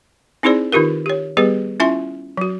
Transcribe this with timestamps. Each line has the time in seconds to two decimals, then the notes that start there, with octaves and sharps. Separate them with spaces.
0.43 C4 D#4 E4 G#4 C5 D5
0.72 D#3 D#4 F4 G4 A#4
1.06 G4 C#5
1.37 G3 B3 G4 G#4 B4
1.80 C#4 E4 F4 E5 G#5 C6
2.37 F#3 F#4